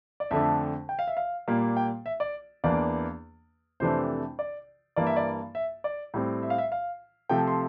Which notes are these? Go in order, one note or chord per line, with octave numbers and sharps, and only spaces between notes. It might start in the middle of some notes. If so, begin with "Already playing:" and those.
D5
F2 D3 A3 D4 E5
G5
F5
E5
F5
A#2 G3 A#3
G5
E5
D5
E2 E3 A#3 D4 D5
F2 C3 E3 A3 D4 C5
D5
G2 E3 A#3 D5
E5
D5
E5
D5
A2 G3 C4
E5
F5
E5
F5
C3 F3 A3 G5
C6